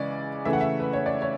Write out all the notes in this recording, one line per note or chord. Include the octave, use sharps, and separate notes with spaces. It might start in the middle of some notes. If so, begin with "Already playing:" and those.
Already playing: C#3 E3 G#3 D5
C#3 E3 A3 E5
F#5
E5
B4
C#5
D5
C#5